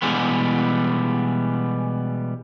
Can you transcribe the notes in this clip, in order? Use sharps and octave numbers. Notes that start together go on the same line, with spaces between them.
B2 E3 G3 G#3 B3